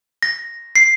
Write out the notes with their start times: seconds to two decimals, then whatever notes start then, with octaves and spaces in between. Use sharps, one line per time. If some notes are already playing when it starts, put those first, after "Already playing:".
0.23 A#6
0.76 C7